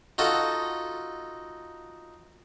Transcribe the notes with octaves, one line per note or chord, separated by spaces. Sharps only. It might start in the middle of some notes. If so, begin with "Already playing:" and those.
D#4 F4 F#4 A4